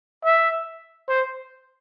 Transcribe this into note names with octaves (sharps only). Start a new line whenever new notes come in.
E5
C5